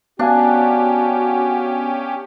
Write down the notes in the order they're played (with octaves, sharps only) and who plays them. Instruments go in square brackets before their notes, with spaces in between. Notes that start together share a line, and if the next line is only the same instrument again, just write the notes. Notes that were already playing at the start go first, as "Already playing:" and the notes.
[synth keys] B3 F5 G#5 [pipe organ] C#4 G4 [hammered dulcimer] D4 [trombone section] F#4